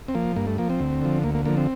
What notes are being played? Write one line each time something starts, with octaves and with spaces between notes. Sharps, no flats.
C4
F3 A#3
G2 A#3
A3
F3 A#3
C4
D2
D3 F3
D2 A#3
A#3
D3 F3 A#3
C4